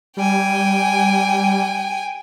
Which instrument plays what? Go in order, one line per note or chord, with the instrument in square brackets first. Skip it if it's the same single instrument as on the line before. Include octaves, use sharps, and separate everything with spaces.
[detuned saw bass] G3 [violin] G5 G#5